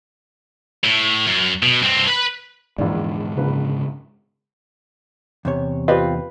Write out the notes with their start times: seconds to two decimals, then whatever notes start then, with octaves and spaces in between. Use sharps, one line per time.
0.84 A2
1.26 F#2
1.63 B2
1.83 G2 C4
2.08 B4 B5
2.78 A#1 E2 G#2 D3 D5
3.37 A#1 C#3 B4
5.45 E2 C3 C#5
5.88 C4 F4 G4 B4 D5 D#5